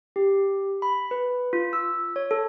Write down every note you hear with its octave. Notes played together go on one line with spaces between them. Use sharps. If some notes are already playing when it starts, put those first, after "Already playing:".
G4
B5
B4
F4
E6
C#5
A4